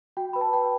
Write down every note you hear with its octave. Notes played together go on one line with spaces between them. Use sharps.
F#4 G5
B4 B5
A5
B4 G5